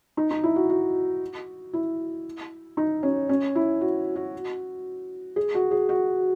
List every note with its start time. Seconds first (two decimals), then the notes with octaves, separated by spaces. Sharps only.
0.17 D#4
0.31 D#4
0.43 E4
0.56 F#4
0.70 F#4
1.73 E4
2.77 D#4
3.03 C#4
3.29 C#4
3.55 E4
3.81 F#4
4.16 F#4
5.36 G#4
5.54 F#4
5.71 G#4
5.89 F#4